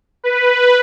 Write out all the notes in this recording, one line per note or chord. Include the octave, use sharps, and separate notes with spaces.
B4